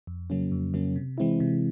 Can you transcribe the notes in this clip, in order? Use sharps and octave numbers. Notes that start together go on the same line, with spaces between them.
F2
C#3 F#3 A#3 C#4
F2
C#3 F#3 A#3 C#4
C3
E3 G#3 C4 E4
C3